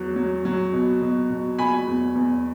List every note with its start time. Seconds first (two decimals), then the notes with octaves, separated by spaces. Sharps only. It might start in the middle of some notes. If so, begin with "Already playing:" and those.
Already playing: E2 F#3
0.16 F#3
0.45 F#3
0.73 B2
1.01 B2
1.30 B2
1.59 B2 G#5 B5
1.87 E2
2.15 E2